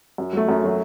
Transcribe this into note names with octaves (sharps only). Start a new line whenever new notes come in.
F#2
F#3 A3
F#2
F#3 A3